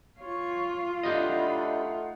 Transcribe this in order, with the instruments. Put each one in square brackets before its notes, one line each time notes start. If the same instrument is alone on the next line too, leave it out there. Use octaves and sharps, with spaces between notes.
[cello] F4 [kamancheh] C#5 C#6
[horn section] A3 D#4 F#5 [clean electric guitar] D4 G4 D#5 [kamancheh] B5